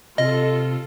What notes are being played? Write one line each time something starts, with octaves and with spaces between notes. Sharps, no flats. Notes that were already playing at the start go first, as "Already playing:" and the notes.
C3 F4 A4 D#5